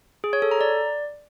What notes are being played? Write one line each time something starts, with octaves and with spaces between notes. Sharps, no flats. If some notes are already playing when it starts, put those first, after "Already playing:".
G#4
C#5
A4
A#5
D5